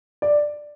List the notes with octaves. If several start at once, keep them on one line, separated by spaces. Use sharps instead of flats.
D5